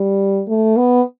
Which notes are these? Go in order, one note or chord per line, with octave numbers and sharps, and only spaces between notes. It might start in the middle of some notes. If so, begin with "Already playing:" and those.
Already playing: G3
A3
B3